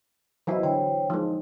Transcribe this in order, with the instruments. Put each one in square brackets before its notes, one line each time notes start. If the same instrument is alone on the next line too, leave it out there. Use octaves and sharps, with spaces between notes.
[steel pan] E3 F#3 E4 [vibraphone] C5 D#5
[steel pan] D3 [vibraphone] C5 C#5 G5
[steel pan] F3 G#3 [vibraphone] D#4